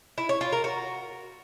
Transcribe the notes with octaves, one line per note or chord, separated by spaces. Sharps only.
E4
C#5
F4
A#4
F#4